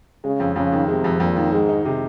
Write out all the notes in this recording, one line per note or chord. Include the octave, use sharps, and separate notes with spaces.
C#3 G#3
F2
F2 C#3
D#3
C3 G#3
F2
F2 A#2
D#3
G#2 G#3
D#4
C3